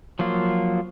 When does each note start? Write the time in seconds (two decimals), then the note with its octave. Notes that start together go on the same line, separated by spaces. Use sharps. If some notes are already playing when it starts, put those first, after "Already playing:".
0.19 F3 F#3 A#3 F4